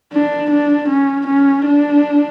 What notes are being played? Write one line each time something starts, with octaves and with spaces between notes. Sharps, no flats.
D4
D4
C#4
C#4
D4